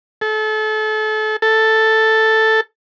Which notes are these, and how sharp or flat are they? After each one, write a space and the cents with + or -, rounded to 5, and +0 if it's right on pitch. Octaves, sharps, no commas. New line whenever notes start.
A4 -30
A4 +5